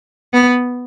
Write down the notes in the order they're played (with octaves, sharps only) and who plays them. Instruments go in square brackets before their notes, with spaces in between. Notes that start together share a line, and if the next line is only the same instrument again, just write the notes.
[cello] B3